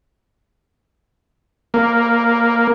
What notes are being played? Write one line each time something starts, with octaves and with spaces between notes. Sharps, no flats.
A#3